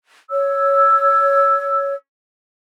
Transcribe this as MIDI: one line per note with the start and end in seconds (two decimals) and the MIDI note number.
0.30 1.94 73
0.30 1.94 88